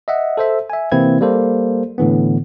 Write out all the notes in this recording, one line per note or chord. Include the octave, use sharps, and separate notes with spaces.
D#5 E5 F#5
A4 C5 E5
E5 G#5
C3 E3 A#3 C4 E4 G#6
G3 A#3 A4 C5
A2 D3 E3 B3